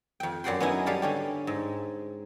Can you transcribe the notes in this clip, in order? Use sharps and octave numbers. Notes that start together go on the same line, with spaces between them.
F2 G5
F#2 F#3 D5 F#5 G5 C6
B3 C#4 D#4 E4 G#5
G3 G4 A4 F5
D3 C#4 G4
G#2